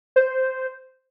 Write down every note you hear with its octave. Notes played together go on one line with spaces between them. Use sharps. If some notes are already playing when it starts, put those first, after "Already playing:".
C5